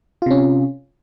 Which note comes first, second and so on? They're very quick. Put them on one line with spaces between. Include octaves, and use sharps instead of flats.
F4 C3 C#4